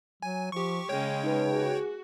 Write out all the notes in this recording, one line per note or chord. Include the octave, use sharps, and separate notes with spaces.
F#3 G#5
F3 G4 C#6
C#3 G#3 C#4 C#5 G5
D#4 B4
F#4 G#4